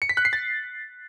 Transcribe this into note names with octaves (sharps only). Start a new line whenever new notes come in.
C#7
B6
F#6
C7
A6